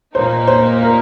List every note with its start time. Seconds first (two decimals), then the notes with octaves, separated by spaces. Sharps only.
0.14 A#2 A#3 D#4 C5
0.48 C5
0.83 A#4